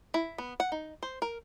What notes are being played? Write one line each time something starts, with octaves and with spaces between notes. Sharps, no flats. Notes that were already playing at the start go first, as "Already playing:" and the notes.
E4
B3
F#5
D#4
C5
A#4